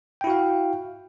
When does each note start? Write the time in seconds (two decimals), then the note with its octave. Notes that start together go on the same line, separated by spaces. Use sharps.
0.21 G5
0.24 E4
0.27 F#4
0.30 F5